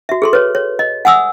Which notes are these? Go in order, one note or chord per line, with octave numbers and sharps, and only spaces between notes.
F#4 E5
G#4 A4 C6
B4 C#5
C#5
D#5
F#5 G#5 D#6 E6